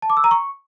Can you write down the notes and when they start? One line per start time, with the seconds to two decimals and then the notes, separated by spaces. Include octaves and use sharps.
0.02 A5
0.10 D6
0.17 E6
0.24 A#5
0.31 C#6